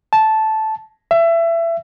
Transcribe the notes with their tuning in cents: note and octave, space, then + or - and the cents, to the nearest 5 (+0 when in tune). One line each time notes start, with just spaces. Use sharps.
A5 -10
E5 +25